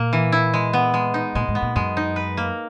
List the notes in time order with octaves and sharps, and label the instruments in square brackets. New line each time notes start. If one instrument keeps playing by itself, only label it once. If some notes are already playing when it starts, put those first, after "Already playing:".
Already playing: [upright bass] A#2 [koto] A#3
[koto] E3
E4
G#3
B3
G#3
D#4
[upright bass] A#2 [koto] G#3
[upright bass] G#2
[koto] B3
[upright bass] A#2
[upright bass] F#2 [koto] G#3
[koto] D#4
B4
A#3